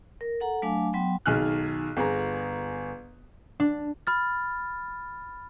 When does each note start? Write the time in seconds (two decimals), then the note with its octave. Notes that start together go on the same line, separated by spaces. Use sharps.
0.21 A#4
0.40 A4 F#5 A#5
0.62 F#3 A3 D4 F5 G#5 D6
0.93 F#3 B3 G5 C6
1.26 B1 D#3 G#4 G#5 F6 F#6
1.97 G1 G#4 A#5
3.60 D4
4.07 B5 F6 A6